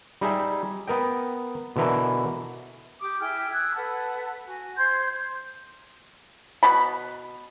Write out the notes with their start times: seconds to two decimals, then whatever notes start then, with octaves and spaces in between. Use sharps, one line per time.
0.21 G3 D#4 G#4 E5
0.88 B3 A#4 D#5 G5
1.76 B2 D3 E3 E4 A#4
3.01 G4 D6 D#6
3.19 E4 G#4 G5 F6
3.52 D#6 E6 F#6 G#6
3.75 A4 B4 F#5 A5
4.47 F#4 G#5
4.77 C5 C6 G6 G#6
6.63 B2 B3 B5